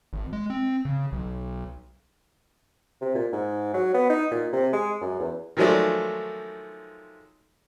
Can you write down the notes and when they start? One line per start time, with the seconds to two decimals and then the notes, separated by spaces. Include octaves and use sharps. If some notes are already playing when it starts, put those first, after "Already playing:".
0.13 G#1
0.33 G#3
0.50 C4
0.85 C#3
1.12 B1
3.01 C3
3.15 A#2
3.33 G#2
3.74 F#3
3.94 B3
4.10 D#4
4.31 A#2
4.53 C3
4.73 G#3
5.01 F#2
5.20 E2
5.57 D#3 F3 F#3 G#3 A3 D5